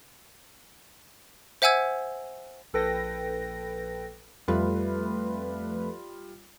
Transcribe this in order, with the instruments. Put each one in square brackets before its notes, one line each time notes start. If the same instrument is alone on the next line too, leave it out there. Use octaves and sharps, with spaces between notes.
[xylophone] C5 E5 F#5 G#5 E6 G#6
[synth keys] A#1 A4 B4 G5 A#6
[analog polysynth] F2 A3 B4 [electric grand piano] G3 F4